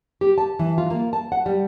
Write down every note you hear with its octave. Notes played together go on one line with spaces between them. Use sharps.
G4
A5
E3
F4
A#3
A5
F#5
G3